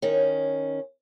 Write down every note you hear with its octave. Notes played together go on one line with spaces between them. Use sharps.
D#3 C#4